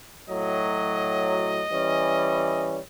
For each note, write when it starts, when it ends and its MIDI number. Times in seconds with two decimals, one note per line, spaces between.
0.29 1.61 45
0.29 1.61 54
0.29 2.68 75
1.70 2.78 52
1.70 2.78 55
1.70 2.78 61